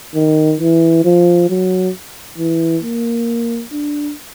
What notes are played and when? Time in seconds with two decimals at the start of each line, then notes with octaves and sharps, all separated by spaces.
0.15 D#3
0.60 E3
1.04 F3
1.49 F#3
2.38 E3
2.83 A#3
3.72 D4